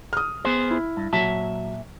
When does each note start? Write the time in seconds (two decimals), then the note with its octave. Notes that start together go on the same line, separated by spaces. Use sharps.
0.13 D#6 F6
0.45 B3 G#4 C5
0.71 E4
0.97 G2
1.13 A#2 F#3 E5 A5